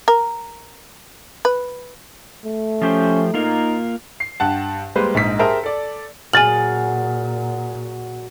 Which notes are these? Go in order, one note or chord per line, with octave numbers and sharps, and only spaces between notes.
A#4
B4
A3
F3 C#4 G4 C5
A#3 D#4 F4 A#4
C7
G2 G4 F#5 A5
G3 G#3 A#3 B4 C5
A#1 G#2 D#4 B6
G4 G#4 A#4 C5 E5 A5
A4 D5
A#2 F#3 F#4 G#4 G#5 F6 A6 F#7